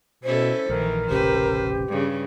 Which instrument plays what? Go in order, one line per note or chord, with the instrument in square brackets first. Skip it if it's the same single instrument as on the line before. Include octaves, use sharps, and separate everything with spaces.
[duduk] B2 [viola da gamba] C#4 E4 A4 [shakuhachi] C5
[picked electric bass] A#1 [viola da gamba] D#3 E3 [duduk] A#4
[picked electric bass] F1 A#1 C#3 [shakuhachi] G4 [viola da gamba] B4 C5
[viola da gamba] G2 C#3